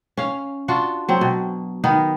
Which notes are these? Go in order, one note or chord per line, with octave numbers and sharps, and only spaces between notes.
C#4 F5
D4 F4 F#4
F#3 C4
B2
D#3 B3 D#4